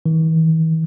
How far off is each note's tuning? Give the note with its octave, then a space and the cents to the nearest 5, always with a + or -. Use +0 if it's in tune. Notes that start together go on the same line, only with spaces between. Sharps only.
E3 -45